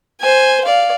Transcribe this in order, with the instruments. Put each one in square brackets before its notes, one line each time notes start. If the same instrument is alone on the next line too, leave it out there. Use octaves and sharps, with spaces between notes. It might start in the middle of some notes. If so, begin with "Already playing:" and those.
[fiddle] C5 G#5
D5 F5